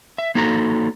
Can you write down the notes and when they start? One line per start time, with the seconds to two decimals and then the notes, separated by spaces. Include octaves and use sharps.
0.18 E5
0.35 A#3 D#4 F#4 A4 A#5